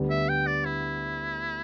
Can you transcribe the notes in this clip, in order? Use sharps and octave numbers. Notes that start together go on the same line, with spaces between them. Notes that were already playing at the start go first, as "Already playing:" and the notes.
Already playing: D2 D3 G3 B3
E5
G5
D5
E4